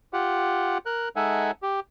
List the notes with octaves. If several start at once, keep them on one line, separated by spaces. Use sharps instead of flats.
F4 G4 F#5
A#4 F#6
G#3 D#4 A4 E5 F#5 G#5
G4